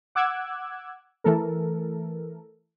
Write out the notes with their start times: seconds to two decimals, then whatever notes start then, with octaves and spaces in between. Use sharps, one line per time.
0.15 F#5 D6 E6 F#6 G#6
1.24 E3 A3 A4 A#4